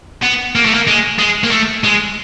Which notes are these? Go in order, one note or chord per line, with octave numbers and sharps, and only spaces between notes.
B3
A#3
A3
A#3
G#3
G#3
A#3
A3
G#3